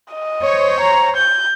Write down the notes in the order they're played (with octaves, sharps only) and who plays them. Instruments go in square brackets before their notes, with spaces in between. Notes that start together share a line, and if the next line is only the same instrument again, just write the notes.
[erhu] D#5
[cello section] C5 C#5
[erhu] A#5
G6